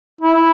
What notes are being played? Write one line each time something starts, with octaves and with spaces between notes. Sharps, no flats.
E4